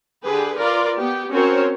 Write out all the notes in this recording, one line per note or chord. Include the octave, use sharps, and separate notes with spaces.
D3 G4 G#4 B4
F4 A#4 B4 D5
B3 G4
C4 C#4 F#4 A#4 C5 C#5